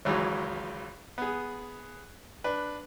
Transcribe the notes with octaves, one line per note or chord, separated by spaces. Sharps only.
G#1 C#2 E3 F#3 G#3
B3 G#4
D4 B4